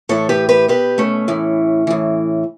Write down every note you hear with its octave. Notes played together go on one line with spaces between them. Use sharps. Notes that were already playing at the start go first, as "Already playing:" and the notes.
A2 E3 A4 C#5
G4 B4
G4 B4
B2 G4 B4
A3 C#4
A2 E3
A2 E3